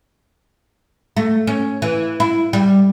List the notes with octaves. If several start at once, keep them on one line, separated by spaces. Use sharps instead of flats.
A3
C#4
E3
E4
G3